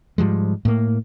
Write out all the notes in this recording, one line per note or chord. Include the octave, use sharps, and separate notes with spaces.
G#2 F3 G3 G#3
A2 A#3